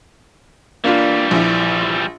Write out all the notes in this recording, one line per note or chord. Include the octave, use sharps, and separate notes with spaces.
E3 G3 A#3 D4 F4
A#1 E4